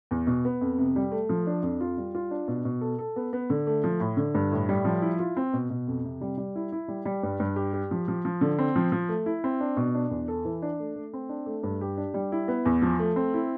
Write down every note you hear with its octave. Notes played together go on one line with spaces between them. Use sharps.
E2
B2
B3
F2
C3
G3
A3
F3
D4
F2
F4
G3
F4
D4
B2
B2
A4
A4
B3
B3
D3
A3
F3
A2
D3
G2
A2
G3
F3
E4
F4
C4
B2
B2
F2
C3
G3
G3
E4
E4
G3
G3
G2
G2
G4
G4
F3
F3
F3
D3
C4
F3
F3
A3
E4
C4
D4
B2
D4
E2
A4
E3
D4
A3
A3
C4
D4
A3
G2
G4
D4
G3
E4
B3
E2
F3
A3
C4
E4